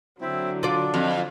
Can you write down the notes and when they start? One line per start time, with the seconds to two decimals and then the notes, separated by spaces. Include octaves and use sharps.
0.21 D3 F#3 C4 E4
0.63 D4 F4 D5
0.94 F2